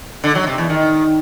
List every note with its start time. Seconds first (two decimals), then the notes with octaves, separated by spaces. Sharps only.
0.24 D3
0.35 F#3
0.47 C3
0.58 E2
0.70 D#3